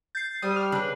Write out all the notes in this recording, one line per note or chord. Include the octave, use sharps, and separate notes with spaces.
G6 A6 C7
G3 C5 D#6
F6
C#3 D4 B4